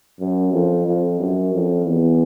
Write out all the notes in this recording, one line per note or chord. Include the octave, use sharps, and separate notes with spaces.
F#2
F2
F2
F#2
F2
E2